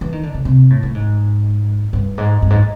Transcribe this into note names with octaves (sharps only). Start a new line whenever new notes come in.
E3
D#3
D3
C#3
C3
A2
A2
G#2
G2
G#2
G2
G#2